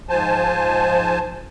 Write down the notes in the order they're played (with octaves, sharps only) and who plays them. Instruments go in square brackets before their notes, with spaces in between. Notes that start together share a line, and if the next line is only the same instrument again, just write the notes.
[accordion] G#2 F3 C5 G#5 A5